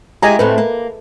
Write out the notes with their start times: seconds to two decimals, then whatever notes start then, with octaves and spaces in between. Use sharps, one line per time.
0.22 G#3 E4 G4 D#5 G#5 A#5
0.39 A2 A3 C4 B4
0.58 A#3